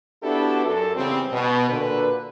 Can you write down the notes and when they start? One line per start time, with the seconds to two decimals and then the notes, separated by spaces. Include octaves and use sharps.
0.23 B3 D4 E4 F#4 G4 A4
0.66 F#2 A4
0.96 E2 C#3 G3 C4
1.33 B2
1.70 A#2 D3 F#4 B4